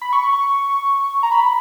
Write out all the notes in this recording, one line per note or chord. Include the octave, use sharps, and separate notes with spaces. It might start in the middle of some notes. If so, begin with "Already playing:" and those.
B5
C#6
A#5
B5